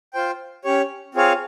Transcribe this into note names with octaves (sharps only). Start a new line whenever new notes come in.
F4 C5 G5
C#4 G4 C#5
C4 F4 G#4 C#5 F5